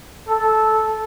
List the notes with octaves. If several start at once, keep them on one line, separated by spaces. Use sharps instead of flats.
A4